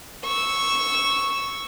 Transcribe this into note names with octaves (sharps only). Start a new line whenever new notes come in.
C#6 E6